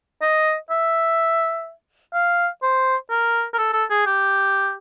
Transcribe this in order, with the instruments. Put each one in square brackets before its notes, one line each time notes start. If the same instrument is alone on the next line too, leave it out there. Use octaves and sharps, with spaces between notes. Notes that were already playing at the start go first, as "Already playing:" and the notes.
[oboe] D#5
E5
F5
C5
A#4
A#4
A4
A4
G#4
G4